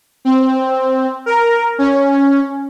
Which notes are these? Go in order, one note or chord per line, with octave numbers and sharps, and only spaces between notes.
C4
A#4
C#4